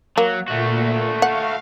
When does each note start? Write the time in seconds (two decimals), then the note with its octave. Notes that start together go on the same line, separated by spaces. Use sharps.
0.18 F#3 A#3
0.48 A#2 A3 F#4
1.22 F5 F#5